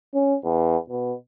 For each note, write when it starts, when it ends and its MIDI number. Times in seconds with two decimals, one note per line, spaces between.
0.14 0.36 61
0.44 0.77 40
0.89 1.13 47